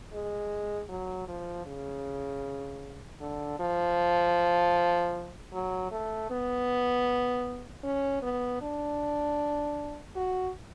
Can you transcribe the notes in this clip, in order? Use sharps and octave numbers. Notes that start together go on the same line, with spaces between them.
G#3
F#3
F3
C#3
D3
F3
F#3
A3
B3
C#4
B3
D4
F#4